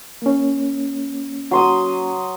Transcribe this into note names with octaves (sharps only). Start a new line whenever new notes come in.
A#3 C#4
F#3 C6 D#6